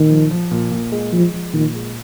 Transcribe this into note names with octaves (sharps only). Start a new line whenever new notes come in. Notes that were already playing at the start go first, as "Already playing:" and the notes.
Already playing: A#2 D#3
F3
F3
A#2
A#2
G#3
F3 G#3
F3
A#2 D#3
G#3